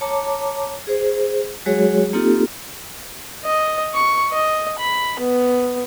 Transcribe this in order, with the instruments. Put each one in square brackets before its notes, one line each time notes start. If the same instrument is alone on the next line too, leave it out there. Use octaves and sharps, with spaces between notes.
[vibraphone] C#5 A5 A#5 D6
G#4 C5
F#3 G#3 F#4 G#4 C#5
A#3 C4 D#4 F4 G4 A4
[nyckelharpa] D#5
C#6
D#5
B5
B3